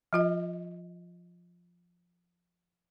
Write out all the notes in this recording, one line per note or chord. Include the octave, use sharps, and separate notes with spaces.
F3 F4 D#5